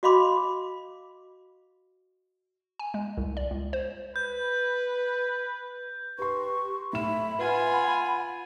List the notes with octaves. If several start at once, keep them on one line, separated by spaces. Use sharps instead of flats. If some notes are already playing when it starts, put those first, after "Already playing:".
F#4 D#5 F5 B5 C6 D6
G#5
G#3
C2
D5
C#2
C5
B4 G6
G4 B4 C6 C#6
A2 E5 B5 E7
F4 B4 F#5 G#5